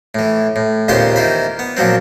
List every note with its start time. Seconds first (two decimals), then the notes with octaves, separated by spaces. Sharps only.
0.15 A2 E3
0.56 A2
0.88 D#2 A#2 C#3 B3 C5 C6
1.16 D#3 E3 C5 B5
1.59 B3
1.77 A#2 F3 F#3 C4